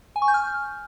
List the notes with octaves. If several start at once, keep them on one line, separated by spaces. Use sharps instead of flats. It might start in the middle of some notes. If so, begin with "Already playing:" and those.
G#5
C#6
G6
F6